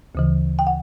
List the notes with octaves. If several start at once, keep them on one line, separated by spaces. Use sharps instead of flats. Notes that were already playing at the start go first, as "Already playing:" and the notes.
D2 C#3 E3
G5
F#5